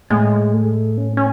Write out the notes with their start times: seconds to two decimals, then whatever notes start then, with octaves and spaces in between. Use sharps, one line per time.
0.10 A2 G#3
0.54 A3
0.98 C#4
1.17 C#4